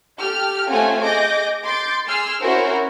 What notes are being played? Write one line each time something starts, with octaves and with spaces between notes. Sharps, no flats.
G4 A4 F6
A3 C4 C#4 F4 F#5 G#5
G#4 D#5 D6 G6 A#6
C6 D6 G6 A6
G#4 C6 E6 F6 C7
C#4 E4 F#4 A#4 C5